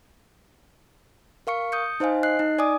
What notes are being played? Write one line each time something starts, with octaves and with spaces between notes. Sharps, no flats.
A#4 F5 C#6 C#7
D#6 G6 C#7
D#4 C5 D#5 F5 G#5
D#5 F#6 C7
D#4
D5 G#5 D6 D#6